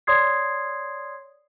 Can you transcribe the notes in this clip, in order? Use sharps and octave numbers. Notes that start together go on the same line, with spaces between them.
C#5 D5 C6 D#6 G#6 C7